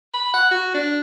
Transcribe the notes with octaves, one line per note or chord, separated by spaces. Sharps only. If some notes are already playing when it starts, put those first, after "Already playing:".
B5
F#5
F#4
D4